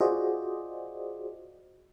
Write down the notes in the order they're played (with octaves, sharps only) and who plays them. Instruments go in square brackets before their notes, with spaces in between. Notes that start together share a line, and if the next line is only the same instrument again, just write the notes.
[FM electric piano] F4 F#4 G#4 C5 D5 D#5